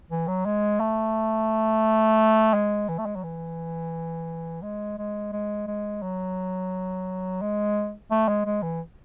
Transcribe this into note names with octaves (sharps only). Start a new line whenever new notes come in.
E3
F#3
G#3
A3
G#3
E3
A3
G#3
F#3
E3
G#3
G#3
G#3
G#3
F#3
G#3
A3
G#3
G#3
E3